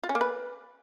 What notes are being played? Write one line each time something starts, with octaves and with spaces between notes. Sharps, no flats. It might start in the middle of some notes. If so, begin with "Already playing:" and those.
F4
C#4
A#3
B4